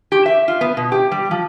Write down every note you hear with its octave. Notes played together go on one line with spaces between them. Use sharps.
G4
E5
F4
B3
B2
G4
G3
F3